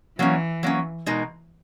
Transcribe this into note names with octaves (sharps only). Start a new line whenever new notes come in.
E3 F#3 A#3 C#4
F#3 A#3 C#4
B2 G#3 D#4 A#4